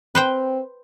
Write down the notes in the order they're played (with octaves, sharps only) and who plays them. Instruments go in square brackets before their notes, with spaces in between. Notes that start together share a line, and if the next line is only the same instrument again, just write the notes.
[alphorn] C4 [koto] B4 C5 G5